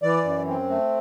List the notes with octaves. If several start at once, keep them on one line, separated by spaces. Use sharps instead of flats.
E3 D5
F#2
C4
A3